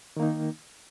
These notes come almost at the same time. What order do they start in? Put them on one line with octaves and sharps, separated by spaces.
D#3 A#3 D#4